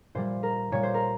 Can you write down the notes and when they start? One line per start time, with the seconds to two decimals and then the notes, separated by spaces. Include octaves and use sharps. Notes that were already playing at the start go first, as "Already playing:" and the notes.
0.15 A#2 G3 C5
0.43 A#4
0.72 A#2 G3 C#5
0.83 C5
0.94 A#4